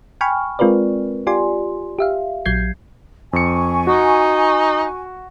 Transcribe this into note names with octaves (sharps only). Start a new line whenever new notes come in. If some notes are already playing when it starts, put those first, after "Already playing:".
G5 G#5 B5 C#6 F6
G#3 C4 F4 A#4 B4 D5
F4 G4 D5 G#5 C6
G4 E5 F5
A#1 F#3 G6 G#6 C7
F2 G#5 C#6 C#7
D#4 F#4